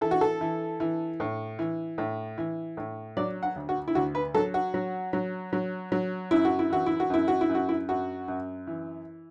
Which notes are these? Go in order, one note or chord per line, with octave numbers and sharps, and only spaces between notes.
E3 A4
F#4
A4
E3
E3
A2
E3
A2
E3
A2
F#3 D5
F#5
D2
F#4
E4
D2 F#4
B4
F#3 A4
F#4
F#3
F#3
F#3
F#3
F#2 E4
F#4
E4
E3 F#4
E4
F#4
F#2 E4
F#4
E4
F#2
F#4
E4
F#2 F#4
F#2
E3